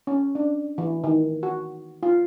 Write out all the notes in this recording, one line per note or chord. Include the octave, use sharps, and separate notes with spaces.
C#4
D4
E3
D#3
F#4
F4